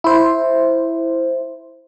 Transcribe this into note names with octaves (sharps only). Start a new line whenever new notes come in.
E4 C5